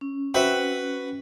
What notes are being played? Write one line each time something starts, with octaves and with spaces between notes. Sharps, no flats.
C#4
C4 F#4 B4 E5